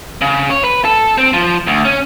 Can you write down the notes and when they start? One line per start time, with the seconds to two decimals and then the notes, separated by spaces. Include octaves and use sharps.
0.22 C#3
0.50 C#5
0.63 B4
0.85 A4
1.18 C4
1.33 F3
1.67 D2
1.85 C#4